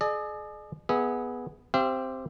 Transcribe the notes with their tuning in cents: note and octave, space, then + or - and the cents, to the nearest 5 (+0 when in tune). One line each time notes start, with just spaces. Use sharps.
G#4 +40 D5 +45
B3 -5 G#4 +0 E5 -35
C4 +0 G4 +0 F5 -45